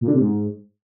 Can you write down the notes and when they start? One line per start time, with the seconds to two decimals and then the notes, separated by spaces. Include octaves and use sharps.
0.01 A#2
0.08 D3
0.14 C3
0.21 G#2